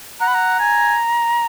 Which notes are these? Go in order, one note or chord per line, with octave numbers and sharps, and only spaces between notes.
F#5 A#5
B5
A#5
G#5